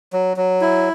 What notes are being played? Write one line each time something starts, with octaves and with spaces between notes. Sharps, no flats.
F#3
F#3
E4